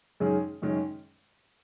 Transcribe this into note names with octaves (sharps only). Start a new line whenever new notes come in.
F#2 D#3 G#3 C#4 G#4
F#2 D#3 G#3 C#4 G#4